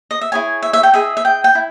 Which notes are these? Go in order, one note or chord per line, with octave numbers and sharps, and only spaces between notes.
D#5
E5
E4 G#4 C#5 G#5
E5
E5
G5
E4 G#4 D#5 E5
E5
G5
G5
E4